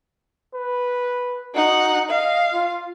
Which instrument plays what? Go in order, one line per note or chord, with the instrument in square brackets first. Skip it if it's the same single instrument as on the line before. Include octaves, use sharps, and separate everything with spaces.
[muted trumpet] B4
[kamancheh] D#4 F#5 [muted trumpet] F#4
[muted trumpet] D#5 [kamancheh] F5
[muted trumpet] F4